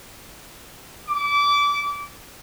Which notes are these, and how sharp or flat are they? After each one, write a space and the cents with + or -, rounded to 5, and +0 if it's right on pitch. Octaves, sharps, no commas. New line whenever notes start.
D6 -25